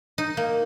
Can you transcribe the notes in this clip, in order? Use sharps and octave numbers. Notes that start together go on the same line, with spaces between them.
D#4
A#3